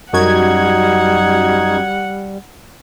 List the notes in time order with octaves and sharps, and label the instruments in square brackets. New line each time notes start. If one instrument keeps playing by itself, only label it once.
[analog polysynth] F#2 F#4 G#6 [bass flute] G3 [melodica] D#4 [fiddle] F#5